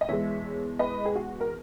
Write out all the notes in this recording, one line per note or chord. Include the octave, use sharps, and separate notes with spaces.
D#5
E2 B2 G#3 C#5 E5
B4 D#5
G#4
F#4
A#4